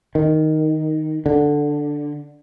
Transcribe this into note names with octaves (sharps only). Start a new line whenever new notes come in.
D#3
D3